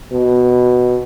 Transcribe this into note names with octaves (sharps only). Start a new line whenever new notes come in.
B2